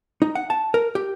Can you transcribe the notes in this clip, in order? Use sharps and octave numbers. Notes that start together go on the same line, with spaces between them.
D#4
F#5
A5
A#4
G4